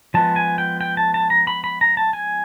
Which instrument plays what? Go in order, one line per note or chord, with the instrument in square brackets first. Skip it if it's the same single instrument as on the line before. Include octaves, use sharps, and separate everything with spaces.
[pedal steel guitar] F3 G#3 B3 A5
G#5
G5
G5
A5
A5
A#5
B5
B5
A#5
A5
G#5